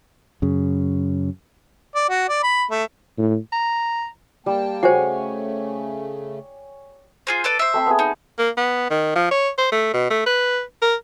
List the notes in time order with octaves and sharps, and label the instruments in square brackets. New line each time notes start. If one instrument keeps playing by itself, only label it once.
[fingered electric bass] F#2 C#3
[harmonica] D5
F#4
D5
B5
A3
[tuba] A2
[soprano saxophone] A#5
[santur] G3 [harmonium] A#3 G5 A5
[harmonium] C#3 A3 [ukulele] F#4 [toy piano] C5 F#5 [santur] C#5 G#5
[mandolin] F4 G#4 C5
A4 B4 D5
C5 E5
[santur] A3 C4 B5
B3 G#4
[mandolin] D#4
[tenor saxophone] A#3
B3
D#3
F3
C#5
C5
A3
B2
A3
B4
A#4